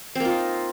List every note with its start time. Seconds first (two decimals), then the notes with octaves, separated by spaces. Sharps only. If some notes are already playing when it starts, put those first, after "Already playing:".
0.15 C4
0.20 A#3
0.25 F4
0.30 D#4